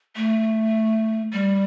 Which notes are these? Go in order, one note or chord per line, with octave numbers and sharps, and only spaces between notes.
A3
G3